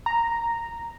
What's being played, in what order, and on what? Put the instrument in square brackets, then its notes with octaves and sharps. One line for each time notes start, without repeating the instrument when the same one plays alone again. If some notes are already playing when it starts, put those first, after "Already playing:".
[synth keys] A#5